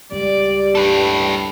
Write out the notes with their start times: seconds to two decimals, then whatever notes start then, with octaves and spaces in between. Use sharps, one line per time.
0.12 C#2 G3 D5
0.75 G2 A4 B4